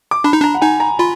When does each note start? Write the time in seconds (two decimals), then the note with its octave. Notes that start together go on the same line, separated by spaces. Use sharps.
0.11 D6
0.24 D4 B5
0.33 D#4
0.41 D4 A#5
0.54 F#5
0.61 D#4 G#5
0.80 A#5
0.99 F4 B5